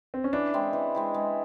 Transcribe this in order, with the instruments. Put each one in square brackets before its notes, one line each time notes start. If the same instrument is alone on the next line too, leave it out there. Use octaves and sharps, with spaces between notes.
[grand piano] C4
C#4
[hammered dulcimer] E3 [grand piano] D4
[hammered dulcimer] G#3 C4 E4
E3
G#3 C4 E4
G#3